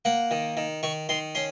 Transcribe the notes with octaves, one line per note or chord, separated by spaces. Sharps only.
A#3 F#5
D#3
D#3
D#3 C#6
D#3 C6
C#4 C6